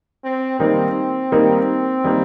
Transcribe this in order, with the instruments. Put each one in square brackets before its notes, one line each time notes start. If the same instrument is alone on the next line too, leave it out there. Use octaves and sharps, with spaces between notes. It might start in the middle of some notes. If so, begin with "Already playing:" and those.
[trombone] C4
[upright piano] D#3 G3 A#3 D#4 A#4 [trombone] C4
[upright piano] D#3 G3 A#3 D#4 A#4
D#3 G3 A#3 D#4 A#4